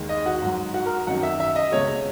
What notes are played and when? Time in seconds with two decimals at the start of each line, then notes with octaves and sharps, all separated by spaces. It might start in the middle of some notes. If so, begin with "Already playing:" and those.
Already playing: D#2 D#3 G#3
0.09 D#5
0.26 F#4
0.42 G#2 F#3
0.74 F#4
0.86 A#4
1.07 F#2 D#3 F#3 F#5
1.23 E5
1.40 E5
1.56 D#5
1.72 C#2 B2 G#3 C#5